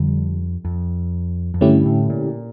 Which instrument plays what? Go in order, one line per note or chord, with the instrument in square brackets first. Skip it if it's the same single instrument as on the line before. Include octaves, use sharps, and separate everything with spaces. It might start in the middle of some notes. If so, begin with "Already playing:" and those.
Already playing: [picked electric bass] F2 [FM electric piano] D3 G3
[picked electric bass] F2
F2
[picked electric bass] G2 [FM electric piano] D3 A3 C#4 E4 G4
[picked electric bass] A2
A#2